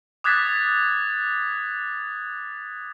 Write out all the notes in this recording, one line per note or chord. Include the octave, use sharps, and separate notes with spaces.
D6 D#6 F#6 G#6 A6 B6